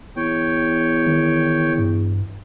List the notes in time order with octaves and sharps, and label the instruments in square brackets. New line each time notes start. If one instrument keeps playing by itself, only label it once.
[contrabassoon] E2 [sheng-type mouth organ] C#5 G5
[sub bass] D#3
G2